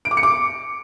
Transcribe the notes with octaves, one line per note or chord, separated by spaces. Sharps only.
D7
D6
C#7
D6